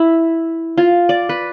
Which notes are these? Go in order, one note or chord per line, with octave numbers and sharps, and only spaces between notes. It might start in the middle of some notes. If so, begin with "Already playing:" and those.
Already playing: E4
F4
D5
B4